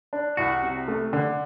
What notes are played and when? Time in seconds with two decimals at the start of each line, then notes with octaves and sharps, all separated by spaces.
0.13 D4
0.37 C2 F#4
0.63 C3
0.88 A3
1.13 D3